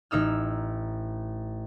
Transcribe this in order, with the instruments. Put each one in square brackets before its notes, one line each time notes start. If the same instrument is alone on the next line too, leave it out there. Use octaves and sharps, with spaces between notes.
[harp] A1 D#4 E6 F6